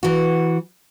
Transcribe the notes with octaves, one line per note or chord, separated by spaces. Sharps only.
E3 F#4